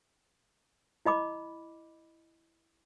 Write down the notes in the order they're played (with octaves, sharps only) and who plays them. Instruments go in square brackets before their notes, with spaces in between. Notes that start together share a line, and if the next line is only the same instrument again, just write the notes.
[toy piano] E4 D#5 B5 D6